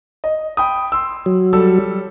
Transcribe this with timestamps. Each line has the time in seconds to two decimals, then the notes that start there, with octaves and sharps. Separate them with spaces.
0.24 D#5
0.57 G5 B5 D#6
0.92 C6 E6
1.26 F#3
1.53 G3 A4 E6